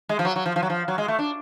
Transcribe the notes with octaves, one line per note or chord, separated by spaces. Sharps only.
G#3
F3
F#3
F#3
F3
F3
F#3
F3
F#3
G#3
A3
D4